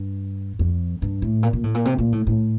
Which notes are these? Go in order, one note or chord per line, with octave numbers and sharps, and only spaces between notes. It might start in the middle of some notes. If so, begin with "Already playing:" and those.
Already playing: G2
F2
G2
A2
A#2
A#2
A2
A#2
C3
A#2
A2
A2